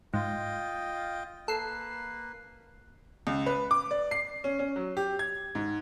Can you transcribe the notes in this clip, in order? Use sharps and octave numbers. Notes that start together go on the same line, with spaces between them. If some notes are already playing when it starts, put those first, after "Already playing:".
G#2 F4 D#5 G5
A#3 A4 B4 C7
C#2
B4
D6
D5
C7
C#4
C#4
F#3
G4
G#6
G#2